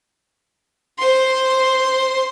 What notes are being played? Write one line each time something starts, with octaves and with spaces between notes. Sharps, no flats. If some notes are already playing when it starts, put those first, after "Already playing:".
C5 C6